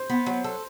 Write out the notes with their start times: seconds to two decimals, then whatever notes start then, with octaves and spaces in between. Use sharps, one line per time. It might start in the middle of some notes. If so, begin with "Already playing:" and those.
Already playing: C5
0.10 B3
0.26 F#3
0.44 A4